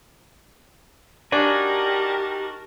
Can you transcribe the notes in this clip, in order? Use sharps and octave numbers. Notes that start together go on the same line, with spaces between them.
D4 D#4 F#4 G4 A#4 G#5 A5